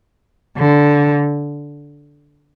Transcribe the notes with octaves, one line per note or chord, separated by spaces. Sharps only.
D3